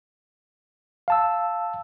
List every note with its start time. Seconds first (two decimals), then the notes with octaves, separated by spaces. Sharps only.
1.08 F5 A5 E6